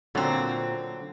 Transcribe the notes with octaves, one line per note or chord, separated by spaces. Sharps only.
A#2 D3 F#3 C4